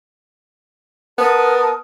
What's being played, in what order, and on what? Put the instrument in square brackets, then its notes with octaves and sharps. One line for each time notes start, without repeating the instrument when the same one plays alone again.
[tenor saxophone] B3 [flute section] A#4 A5 D#6